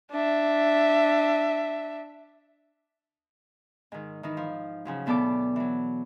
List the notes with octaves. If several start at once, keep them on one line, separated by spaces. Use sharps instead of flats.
D4 E5
G#2 D#3
D#3 E3 D#4
F3
C#3 F3 F#3
D2 B2 B3 A4 D5 D6
E3 F#3